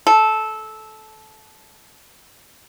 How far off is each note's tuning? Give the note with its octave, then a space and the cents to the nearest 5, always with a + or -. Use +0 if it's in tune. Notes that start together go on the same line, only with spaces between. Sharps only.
A4 -15